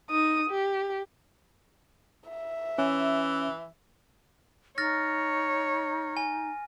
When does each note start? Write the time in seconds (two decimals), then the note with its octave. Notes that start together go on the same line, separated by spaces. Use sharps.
0.10 D#4 D#6
0.50 G4
2.30 E5
2.78 E3 C#4
4.78 D#4 C#5 F6 A6 A#6
6.17 G#5